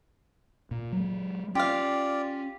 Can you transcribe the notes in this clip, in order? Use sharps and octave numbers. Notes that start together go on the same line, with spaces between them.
A#2
F#3 G#3
C#4 F4 G4 D5 F5